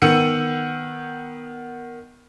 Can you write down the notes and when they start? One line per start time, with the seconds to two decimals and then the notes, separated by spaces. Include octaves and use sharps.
0.02 D#3 B3 E6 C#7 D#7